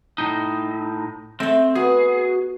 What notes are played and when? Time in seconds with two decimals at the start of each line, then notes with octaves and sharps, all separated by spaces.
0.18 A2 D#4
1.40 A3 C4 F#5
1.75 B3 F#4 G#4